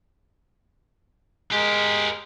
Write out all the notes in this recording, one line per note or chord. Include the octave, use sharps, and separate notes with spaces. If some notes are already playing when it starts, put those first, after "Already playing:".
G#3 G4 A#4